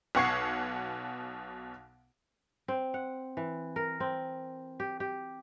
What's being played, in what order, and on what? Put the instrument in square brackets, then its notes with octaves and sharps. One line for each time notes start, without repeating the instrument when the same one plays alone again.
[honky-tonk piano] B1 B2 F#5 C#6 G#6 C7
[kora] C4
F#5
E3
A#4
C4
G4
G4